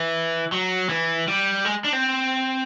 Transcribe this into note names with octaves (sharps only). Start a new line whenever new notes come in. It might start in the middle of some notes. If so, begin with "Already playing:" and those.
Already playing: E3
F#3
E3
G3
G#3
D4
C4